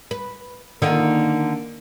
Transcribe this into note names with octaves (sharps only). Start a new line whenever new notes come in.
B4
D3 D#3 A#3 F4